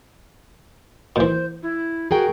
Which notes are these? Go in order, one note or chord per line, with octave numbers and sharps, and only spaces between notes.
A#2 E3 C5
E4
F#4 G#4 A#4 G5